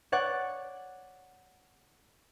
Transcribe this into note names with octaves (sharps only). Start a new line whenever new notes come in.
C#5 D5 F#5